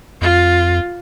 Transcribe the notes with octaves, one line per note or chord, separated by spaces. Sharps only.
F2 F4